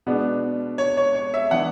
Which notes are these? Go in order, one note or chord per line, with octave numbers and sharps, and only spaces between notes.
B2 G#3 B3 D4
C#5
C#5
C#5
E5
E3 B3 D4 F#5